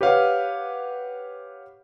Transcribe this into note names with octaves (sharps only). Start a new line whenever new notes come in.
G4 B4 C#5 F5 F#5